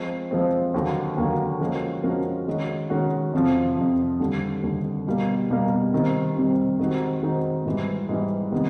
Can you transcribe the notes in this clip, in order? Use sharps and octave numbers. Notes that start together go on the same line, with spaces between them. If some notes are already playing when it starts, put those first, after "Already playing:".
Already playing: F3 G#3 C4
F3 G#3 C4
D#2 D3 F#3 A#3
D#2 D3 F#3 A#3
F3 G#3 C#4 F#4 A#4
F3 G#3 C#4 F#4 A#4
D#3 G#3 C#4 F#4
D#3 G#3 C#4 F#4
F2 C3 F3
F2 C3 F3
D#2 D3 G3
D#2 D3 G3
B2 G3 A#3
B2 G3 A#3
C3 D#3 G3 C4
C3 D#3 G3 C4
D#3 G#3 C4 D#4 F#4
D#3 G#3 C4 D#4 F#4
G#2 E3 G3
G#2 E3 G3
C3 D#3 G3 B3